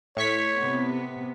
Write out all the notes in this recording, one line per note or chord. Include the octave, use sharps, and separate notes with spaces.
A2 C#5 C#6 B6
C3 B3